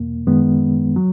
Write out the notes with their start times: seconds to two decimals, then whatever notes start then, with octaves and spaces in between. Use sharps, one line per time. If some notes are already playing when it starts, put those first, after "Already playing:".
Already playing: E2 B2 A#3
0.27 F#2 D#3 G#3 B3
0.96 F#3